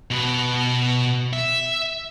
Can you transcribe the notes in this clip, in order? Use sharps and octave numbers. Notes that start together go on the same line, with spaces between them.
B2 B4
E5